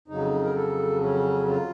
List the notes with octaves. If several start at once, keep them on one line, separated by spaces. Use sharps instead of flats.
F2 C#3 F#3 D#4
A#4
A4
C#4
F4